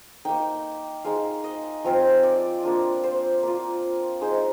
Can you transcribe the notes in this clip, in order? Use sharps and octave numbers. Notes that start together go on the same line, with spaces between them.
A#3 D#4 G5
G#3 D#4 F5
D#5
F3 C4 F4
D5
A#3 D4 F4
C5
A#3 F4
G#3 D#4 C5